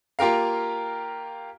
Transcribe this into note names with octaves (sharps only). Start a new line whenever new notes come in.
A#3 F4 G4 A#4 F5